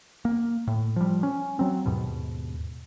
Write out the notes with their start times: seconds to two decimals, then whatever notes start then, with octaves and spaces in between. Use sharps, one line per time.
0.25 A#3
0.67 A2
0.96 F3 G3
1.23 C#4
1.59 F#3 C4
1.86 D#2 G#2 B2